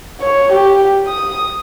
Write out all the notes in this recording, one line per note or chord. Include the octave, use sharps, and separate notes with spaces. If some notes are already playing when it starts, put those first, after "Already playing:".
C#5
G4
D#6